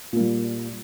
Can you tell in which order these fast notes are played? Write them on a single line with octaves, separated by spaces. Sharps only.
A#2 A#3 G3